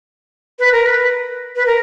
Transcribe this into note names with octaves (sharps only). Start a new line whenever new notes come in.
B4
A#4
B4
B4
A#4